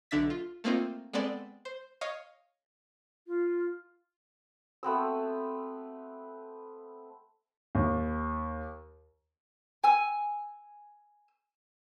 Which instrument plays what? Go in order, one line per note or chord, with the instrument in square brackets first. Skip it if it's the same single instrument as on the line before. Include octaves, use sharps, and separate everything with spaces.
[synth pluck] B1 D3 D4 E5 A6 B6
F4
A3 A#3 C4 D#4 F4
G#3 B3 C4 A4 D5 C6
C5
C#5 D#5 F5
[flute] F4
[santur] A3 B3 C4 E6
[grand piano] D#2
[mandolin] G#5 E6